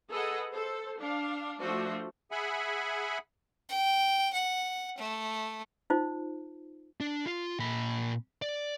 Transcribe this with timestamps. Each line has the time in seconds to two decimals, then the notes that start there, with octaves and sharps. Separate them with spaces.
0.10 G#4 A4 B4 D#5 F#5
0.50 A4 C5
0.99 D4 F5
1.60 F3 A3 D4 F#4 C5
2.31 G#4 E5 F#5 G#5 B5
3.69 G5
4.33 F#5
4.98 A3
5.90 D#4 F4 C5
7.00 D4
7.26 F4
7.59 A#2 B5
8.42 D5